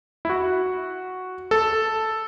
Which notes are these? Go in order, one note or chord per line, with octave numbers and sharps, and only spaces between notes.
E4
F#4
A4